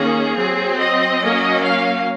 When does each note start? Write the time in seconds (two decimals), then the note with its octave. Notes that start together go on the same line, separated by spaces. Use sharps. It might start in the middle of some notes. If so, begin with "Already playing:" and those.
Already playing: D#3 A#3 C#4 G#4
0.36 F#3 C4
0.78 D#5
1.20 F#3 A#3 C#4
1.63 F5